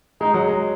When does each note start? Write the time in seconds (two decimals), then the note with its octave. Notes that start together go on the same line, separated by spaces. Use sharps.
0.21 G#3 D#4
0.34 F#3
0.47 G#3